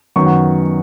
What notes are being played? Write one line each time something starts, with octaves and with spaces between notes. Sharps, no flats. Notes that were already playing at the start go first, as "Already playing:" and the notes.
F#2 D#3 F#3 B3 C#6
F#5